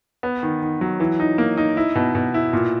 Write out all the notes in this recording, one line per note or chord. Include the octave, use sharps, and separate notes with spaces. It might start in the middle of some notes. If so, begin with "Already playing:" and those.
B3
D#3
D#3
F#3
E3
D#4
A#3
D#4
E4
B2
B2
E4
A#2